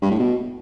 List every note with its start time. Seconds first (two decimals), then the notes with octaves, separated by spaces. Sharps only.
0.02 G2
0.11 A2
0.19 B2